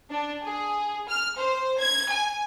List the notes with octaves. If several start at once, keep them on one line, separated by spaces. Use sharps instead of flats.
D4
G#4
F6
C5
G#6
G#5